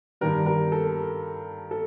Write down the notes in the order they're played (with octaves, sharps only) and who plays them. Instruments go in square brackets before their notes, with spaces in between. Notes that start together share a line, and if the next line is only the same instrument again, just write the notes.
[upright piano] G2 D#3 G3 A#4
A#4
A4
A4